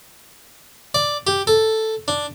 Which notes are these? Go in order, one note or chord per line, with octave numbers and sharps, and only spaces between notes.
D5
G4
A4
D4